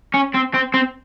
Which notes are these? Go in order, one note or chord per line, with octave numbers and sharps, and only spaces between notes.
C#4
C4
C4
C4